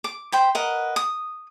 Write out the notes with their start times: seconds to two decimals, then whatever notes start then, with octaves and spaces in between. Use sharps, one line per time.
0.04 D6
0.32 C5 G5 B5
0.55 A#4 B4 D#5 F#5
0.96 D#6